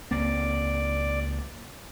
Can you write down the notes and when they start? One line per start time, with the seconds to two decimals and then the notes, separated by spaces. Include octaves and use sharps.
0.11 C#2 A#3 C4 D5